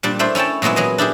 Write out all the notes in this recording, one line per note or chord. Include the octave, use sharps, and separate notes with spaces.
A#2 G3 D4
A3 D4 E4 C5
C#4 E4 C#5 G5 A5
A#2 F#3 G#3 B3 E4
F#3 G#4 D#5
D4 E4 G4 G#4